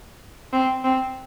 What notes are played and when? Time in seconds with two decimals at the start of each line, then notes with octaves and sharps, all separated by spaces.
0.53 C4
0.84 C4